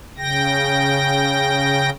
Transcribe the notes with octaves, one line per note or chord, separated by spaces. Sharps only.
C#3 G5 A#6